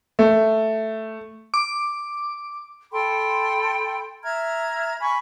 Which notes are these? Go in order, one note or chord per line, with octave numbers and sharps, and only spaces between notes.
A3
D6
A4 G5 B5 C6
E5 A#5 F6 G#6
G#5 B5 C#6